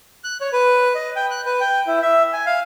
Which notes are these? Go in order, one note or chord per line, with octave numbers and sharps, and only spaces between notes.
F#6
C#5
B4
D#5
G5
F#6
B4
G5
E4
E5
G#5
F5